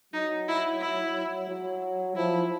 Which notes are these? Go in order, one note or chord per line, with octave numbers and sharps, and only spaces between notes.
F#3 D#4
E4
E4
F#3
F3 E4